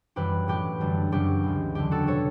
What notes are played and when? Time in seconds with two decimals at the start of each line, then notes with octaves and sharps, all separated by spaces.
0.16 F#2 E3 G3 G4 B4
0.48 A2 F#3 G4
0.81 F#2 D3 G3
1.12 F#2 C#3 F#3 G4
1.44 C#2 C#3 E3
1.75 E2 D3 F#3 G4
1.91 F#4 A4
2.07 B2 G3 A4 C#5